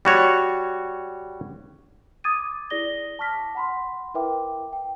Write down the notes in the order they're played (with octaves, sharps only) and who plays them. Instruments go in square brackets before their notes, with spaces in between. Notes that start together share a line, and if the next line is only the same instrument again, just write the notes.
[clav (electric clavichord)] G3 F#4 C#5
[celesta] D6 D#6 G#6 A6 D#7
E4 G#4 D5 A#6 G7
A5 C#6 D6 F6 A#6 B6
F#5 B5 C6
E4 A#4 B4 E5 G5 D6
G5